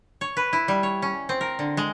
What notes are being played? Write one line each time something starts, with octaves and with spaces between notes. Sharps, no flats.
C#5
B4
E4
G3
C#5
C#4
C4
A#4
D3
G#3